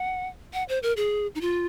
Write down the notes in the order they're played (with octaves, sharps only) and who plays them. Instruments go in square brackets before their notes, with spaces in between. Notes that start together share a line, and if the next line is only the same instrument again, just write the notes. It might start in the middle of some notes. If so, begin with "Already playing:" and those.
Already playing: [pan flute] F#5
F#5
C5
A#4
G#4
D#4
F4